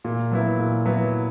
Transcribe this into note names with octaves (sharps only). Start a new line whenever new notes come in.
A#2
F#3 B3 E4
A#2
F#3 B3 E4